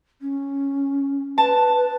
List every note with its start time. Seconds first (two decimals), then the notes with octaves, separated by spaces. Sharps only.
0.21 C#4
1.38 B4 A5